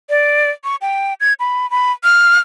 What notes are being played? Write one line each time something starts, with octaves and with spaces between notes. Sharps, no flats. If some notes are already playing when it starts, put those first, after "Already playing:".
D5
C#6
G5
G#6
B5
B5
F6